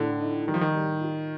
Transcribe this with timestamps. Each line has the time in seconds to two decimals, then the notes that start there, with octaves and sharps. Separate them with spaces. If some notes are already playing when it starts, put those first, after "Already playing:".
Already playing: A2 D3 A4
0.20 D#4
0.47 D#3 G3
0.54 F3
0.61 D#3
0.74 G3
1.01 F4